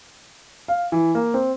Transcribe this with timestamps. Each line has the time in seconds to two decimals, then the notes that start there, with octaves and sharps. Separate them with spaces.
0.68 F5
0.92 E3
1.15 A#3
1.34 C4